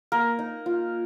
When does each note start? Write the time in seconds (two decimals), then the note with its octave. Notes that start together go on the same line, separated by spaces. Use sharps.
0.12 A#3 A#4
0.39 D#4
0.66 F4